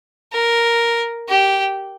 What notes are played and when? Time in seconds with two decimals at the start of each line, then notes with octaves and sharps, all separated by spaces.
0.32 A#4
1.28 G4